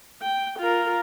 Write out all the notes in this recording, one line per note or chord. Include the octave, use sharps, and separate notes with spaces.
G5
F4 A#4